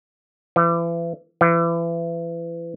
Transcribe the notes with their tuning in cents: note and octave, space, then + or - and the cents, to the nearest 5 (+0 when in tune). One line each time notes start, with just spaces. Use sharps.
E3 +35
E3 +30